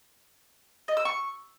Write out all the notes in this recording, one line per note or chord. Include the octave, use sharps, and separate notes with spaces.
D#5
E6
C#6